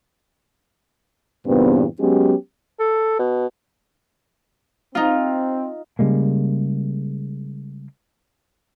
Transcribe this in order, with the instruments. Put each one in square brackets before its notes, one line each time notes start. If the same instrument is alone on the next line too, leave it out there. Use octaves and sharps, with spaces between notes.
[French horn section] E2 G2 A#2 C#3 B3 C4
F#3 G#3 B3 C#4 G4
[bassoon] A4
B2
[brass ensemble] C4 [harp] D#4 F4
[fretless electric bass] C#3 G3 G#3 A#3